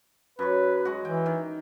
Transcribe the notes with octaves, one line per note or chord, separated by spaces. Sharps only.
F#2 B4 C#6
G#3 F#4
E3 G5
D#3